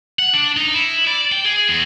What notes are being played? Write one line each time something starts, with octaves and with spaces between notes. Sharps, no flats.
F#5
D4
D#4
E4
D5
G5
G#4
E2